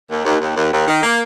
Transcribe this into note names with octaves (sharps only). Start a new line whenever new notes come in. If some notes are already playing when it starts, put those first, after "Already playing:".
D#2
D#2
D#2
D#2
D#2
D#3
A#3